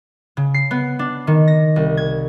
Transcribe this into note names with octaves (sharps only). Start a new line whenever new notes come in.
C#3
C7
B3
D4
D#3
A#6
C2
G#6